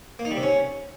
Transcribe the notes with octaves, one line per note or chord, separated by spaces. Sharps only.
A#3
D#4
G3
C3
C#4